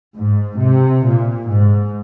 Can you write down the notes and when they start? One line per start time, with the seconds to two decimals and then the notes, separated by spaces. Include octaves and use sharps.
0.16 G#2
0.60 C3
1.05 A#2
1.49 G#2